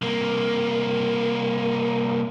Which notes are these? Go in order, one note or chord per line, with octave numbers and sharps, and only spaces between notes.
C2 A#3